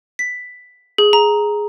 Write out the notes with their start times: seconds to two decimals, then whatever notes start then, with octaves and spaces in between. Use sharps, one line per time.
0.19 B6
0.98 G#4
1.13 A#5